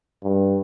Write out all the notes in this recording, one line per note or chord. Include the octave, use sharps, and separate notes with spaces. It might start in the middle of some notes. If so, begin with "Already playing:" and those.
G2